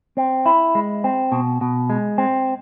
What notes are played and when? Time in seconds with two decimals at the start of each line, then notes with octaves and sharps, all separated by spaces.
0.17 C4
0.46 E4
0.75 G#3
1.04 C4
1.32 B2
1.61 B2
1.90 G#3
2.18 C4